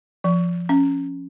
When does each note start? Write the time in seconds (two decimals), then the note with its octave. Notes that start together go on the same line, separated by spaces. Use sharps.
0.24 F3
0.69 C#4